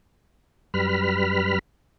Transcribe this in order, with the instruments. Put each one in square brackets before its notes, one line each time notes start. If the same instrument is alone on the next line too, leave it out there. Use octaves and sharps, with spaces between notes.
[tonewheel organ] F#2 G3 B4 B5 F6